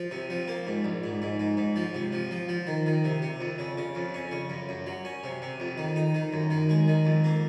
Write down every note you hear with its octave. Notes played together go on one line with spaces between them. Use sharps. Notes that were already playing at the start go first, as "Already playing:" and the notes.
Already playing: F3
C3
F3
A#3
G#2
A#1
G#2
G#2
G#2
G#2
F3
C3
F3
F3
F3
D#3
D#3
C3
C3
F2
C#3
C#3
F2
C#4
C#3
F#2
F#2
F#3
C#4
C3
C3
F2
D#3
D#4
D#3
F#2
D#3
G#3
D#3
F2
A#3